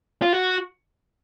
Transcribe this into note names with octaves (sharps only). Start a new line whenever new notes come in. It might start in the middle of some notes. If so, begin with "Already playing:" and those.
F4
F#4